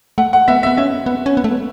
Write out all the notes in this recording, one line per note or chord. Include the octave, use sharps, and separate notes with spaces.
A3 F#5
F#5
B3 E5
E5
B3
C#4 E5
B3
C#4
B3
A3
B3